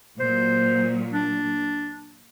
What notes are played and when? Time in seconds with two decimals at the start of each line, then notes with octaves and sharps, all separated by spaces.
0.20 A#2 F#3 C5
1.13 D4